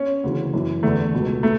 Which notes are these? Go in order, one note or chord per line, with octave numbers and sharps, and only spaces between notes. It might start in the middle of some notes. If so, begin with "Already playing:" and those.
Already playing: C#4
D2 C#3 E3
F#2 E3
E2 D3 A3
C#2 B2
A3